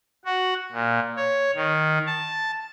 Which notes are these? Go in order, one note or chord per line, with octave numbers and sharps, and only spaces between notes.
F#4
A#2
C#5
D#3
A5